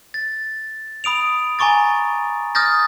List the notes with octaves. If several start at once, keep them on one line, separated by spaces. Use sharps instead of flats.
A6
B5 D#6 D7 F7
G#5 A#5 C#6 D6 A6
D#6 F6 G6 A6 A#6